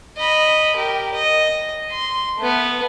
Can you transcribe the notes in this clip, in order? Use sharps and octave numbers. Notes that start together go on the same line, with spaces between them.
D#5 B5
G4 A#4
D#5
C6
A3 B3